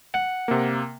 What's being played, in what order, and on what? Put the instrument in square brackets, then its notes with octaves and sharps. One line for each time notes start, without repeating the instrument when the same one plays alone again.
[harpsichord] F#5
[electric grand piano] C3 A#3